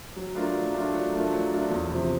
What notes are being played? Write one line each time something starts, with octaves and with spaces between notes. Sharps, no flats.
F#3
A3 D4 F4 A#4
F#3
A3 D4 F4 A#4
F#3
A3 D4 F4 A#4
F#3
A3 D4 F4 A#4
E2
C3 F3